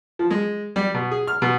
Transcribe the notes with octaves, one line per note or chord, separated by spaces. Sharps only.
F3
G#3
G3
B2
G#4
F6
B2